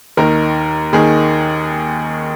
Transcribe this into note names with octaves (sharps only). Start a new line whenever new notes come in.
D#2 D#3 A#4
D#2 D#3 G#4